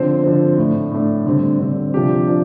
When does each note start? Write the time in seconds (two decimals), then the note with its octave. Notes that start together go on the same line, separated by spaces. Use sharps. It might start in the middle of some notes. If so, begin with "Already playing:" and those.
Already playing: D3 F3 C4 C5
0.24 D3 F3 C4
0.58 A2 A3 D4
0.91 A2 A3 D4
1.26 D3 G3 C4
1.60 D3 G3 C4
1.94 C3 F3 D4 G4
2.27 F3 D4